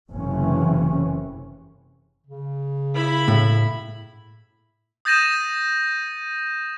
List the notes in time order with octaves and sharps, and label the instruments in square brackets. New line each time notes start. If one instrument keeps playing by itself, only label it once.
[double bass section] F#1 C3 E3 C#4
[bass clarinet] C#3
[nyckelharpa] E4 B5
[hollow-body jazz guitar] A2
[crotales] D#6 G6 A6 A#6 D#7 E7